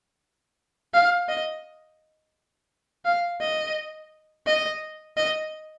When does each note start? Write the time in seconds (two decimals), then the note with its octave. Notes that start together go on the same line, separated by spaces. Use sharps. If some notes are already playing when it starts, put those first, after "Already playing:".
0.94 F5
1.29 D#5
3.05 F5
3.40 D#5
4.46 D#5
5.17 D#5